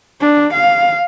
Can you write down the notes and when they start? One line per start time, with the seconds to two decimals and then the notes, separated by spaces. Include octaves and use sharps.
0.20 D4
0.54 F5